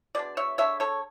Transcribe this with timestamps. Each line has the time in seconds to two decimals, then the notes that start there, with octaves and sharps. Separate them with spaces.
0.15 B2 G#3 D4 D5
0.37 C#5 E5
0.58 D3 G#3 D4 C#5 E5
0.80 A4 C#5